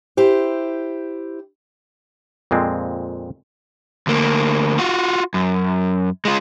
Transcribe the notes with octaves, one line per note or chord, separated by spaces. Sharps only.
E4 G4 C5
F2 A#2 G#3 C4
D2 A#3
F4 F#4
F#2
G#3 F4